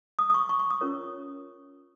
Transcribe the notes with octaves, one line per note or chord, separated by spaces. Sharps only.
D#6
D#6
C#6
C#6
C#6
D#6
C#4 F4 A#4 C#5